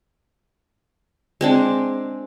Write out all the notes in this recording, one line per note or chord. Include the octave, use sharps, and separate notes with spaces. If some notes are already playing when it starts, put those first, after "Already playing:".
G#3 C4 D4